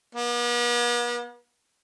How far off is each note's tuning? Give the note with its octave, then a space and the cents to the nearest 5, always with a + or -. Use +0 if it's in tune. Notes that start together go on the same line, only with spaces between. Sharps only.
B3 -45